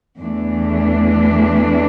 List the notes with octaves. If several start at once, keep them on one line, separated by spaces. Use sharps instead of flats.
E2 E3 A3 D4